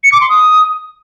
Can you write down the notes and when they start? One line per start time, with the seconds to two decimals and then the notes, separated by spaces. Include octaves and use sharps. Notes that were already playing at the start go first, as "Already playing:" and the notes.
0.04 C#7
0.12 D6
0.21 C6
0.29 D#6